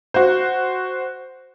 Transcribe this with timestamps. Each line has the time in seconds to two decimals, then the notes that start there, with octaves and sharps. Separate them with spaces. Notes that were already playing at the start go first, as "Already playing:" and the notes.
0.14 F#4 C5